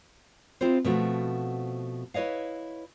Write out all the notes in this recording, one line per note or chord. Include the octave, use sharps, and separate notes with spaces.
C4 E4 F4 G#4 C5
B2 F3 A3 C4 F#4
E4 B4 C#5 D#5 F5